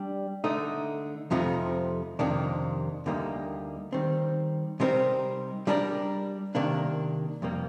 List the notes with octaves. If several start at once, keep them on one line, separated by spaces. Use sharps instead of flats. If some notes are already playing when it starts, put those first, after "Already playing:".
Already playing: G3 D4 G4
D3 A3 D#4
F2 C3 F3 A3 D#4
F2 C3 D#3 A#3 D4
D2 D3 G3 A#3 D#4
D#3 G3 C4
C3 G3 C4 D#4 A#4
G3 D4 G4 A#4 D5
C3 D#3 A#3 D4
F2 C3 G3 A#3